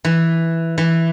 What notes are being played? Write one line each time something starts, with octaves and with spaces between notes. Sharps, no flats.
E3
E3